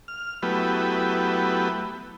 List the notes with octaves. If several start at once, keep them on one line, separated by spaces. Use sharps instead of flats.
F6
F#3 A3 B3 E4 G4 B4